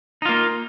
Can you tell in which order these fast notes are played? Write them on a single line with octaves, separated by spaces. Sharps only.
D#4 F4 A#3